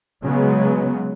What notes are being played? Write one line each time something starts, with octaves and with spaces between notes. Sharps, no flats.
C#3 F#3 G#3 B3